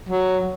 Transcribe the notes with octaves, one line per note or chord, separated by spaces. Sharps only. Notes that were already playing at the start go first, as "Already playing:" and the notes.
F#3